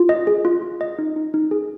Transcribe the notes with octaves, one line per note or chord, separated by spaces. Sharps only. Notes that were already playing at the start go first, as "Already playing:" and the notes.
Already playing: F4
D#5
G#4
F4
F4
D#5
D#4
D#4
D#4
G#4